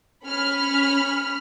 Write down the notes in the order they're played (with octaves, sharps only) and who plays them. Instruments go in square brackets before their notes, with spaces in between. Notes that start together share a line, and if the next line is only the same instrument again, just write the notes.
[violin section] C#4 B5 F6